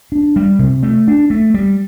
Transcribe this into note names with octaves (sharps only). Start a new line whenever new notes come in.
D4
G3
C3
A3
D4
A3
G3